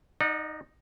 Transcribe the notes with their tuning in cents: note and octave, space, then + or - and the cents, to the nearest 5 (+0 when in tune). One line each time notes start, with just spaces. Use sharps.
D#4 +0 D5 +45 F#5 -25